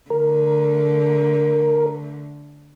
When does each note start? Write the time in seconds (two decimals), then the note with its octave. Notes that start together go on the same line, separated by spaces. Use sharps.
0.10 D3 A3 A#4